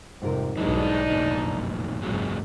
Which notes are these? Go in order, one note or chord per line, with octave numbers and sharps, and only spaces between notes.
F2 G#2 C3 G3 A#4
B1 E2 E3 F#3 G#3 D4 D#4
F1 B1 F#2 A#2 D#3
G#1 C#2 F#2 A#2 F#3 G#3